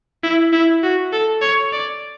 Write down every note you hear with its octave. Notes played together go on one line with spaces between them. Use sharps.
E4
E4
F#4
A4
C#5
D5